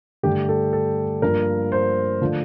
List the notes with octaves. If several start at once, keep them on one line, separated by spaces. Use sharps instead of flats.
G2 D3 A3 G4
A4
A4
G2 F3 A#3 A#4
C5
D3 F3 A3 D4